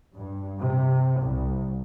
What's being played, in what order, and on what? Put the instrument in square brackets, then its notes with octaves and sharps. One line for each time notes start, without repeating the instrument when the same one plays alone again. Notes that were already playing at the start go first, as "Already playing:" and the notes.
[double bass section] G2
C3
C2